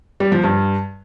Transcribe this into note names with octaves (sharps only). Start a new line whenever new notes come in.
G3
F3
G2